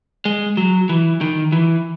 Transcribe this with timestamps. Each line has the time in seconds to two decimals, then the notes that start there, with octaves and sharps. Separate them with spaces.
0.25 G#3
0.57 F#3
0.89 E3
1.21 D#3
1.52 E3